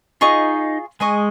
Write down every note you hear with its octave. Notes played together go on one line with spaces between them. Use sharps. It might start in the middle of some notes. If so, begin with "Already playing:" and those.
D#4 F4 G#4 D#5 C#6
G#3 G#4 D#5 G#5 C#6